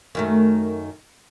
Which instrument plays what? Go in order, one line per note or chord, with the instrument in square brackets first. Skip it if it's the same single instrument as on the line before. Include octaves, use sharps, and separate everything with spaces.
[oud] F#2 D#3 A3